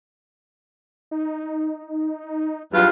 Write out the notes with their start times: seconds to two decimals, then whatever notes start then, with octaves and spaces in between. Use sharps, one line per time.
1.11 D#4
2.73 E2 G2 F#3 F4